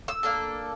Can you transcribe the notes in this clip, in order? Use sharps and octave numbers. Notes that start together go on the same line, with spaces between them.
E6
A#3 D4 A4